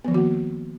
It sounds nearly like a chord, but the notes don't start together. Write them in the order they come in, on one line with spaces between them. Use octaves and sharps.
B3 F3 D#3 F#4 A#3